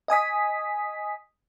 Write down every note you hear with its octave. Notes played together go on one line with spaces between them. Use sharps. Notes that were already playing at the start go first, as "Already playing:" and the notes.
D#5 G#5 D#6 B6